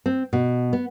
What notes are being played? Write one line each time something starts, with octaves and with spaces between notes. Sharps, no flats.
C4
B2
B3